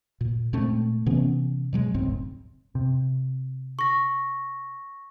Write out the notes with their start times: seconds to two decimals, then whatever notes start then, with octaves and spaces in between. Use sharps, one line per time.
0.21 A#2
0.53 A#2 G#3 A3 C4
1.06 C3 E3 B3 C#4
1.73 B2 F#3 G#3
1.94 F1 C#2 G#2 C4
2.75 C3
3.79 C#6 A#6